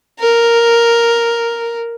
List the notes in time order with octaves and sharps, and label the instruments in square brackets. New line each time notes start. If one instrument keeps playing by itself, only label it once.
[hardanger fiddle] A#4